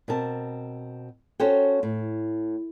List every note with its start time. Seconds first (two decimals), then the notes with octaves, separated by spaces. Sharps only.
0.08 B2 C4 A#4 A5
1.40 C#4 F#4 A4 C5 C#5 G5
1.83 A2